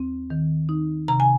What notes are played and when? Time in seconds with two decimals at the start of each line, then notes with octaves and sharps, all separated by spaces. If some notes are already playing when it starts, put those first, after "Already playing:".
Already playing: D#2 C4
0.30 D#3
0.69 D#4
1.08 C3 A#5
1.20 G#5